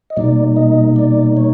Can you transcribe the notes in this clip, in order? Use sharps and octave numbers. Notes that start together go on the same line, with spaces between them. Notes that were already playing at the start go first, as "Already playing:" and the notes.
D#5
B2 G3 A#3 D#4 D5
D#5
D5
C#5